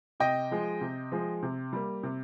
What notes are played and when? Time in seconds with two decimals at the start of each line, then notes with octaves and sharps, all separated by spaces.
0.20 C3 D#5 G5
0.51 F3 G#3
0.81 C3
1.12 F3 G#3
1.43 C3
1.73 G3 A#3
2.03 C3